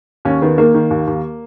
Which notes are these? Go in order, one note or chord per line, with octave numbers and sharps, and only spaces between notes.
D#2 C#4
D#3 B3
D#3 A#3
D#3
D#2
D#2